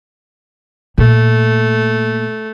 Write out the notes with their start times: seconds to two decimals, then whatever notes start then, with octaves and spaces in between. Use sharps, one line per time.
0.98 A#2 A3 A#3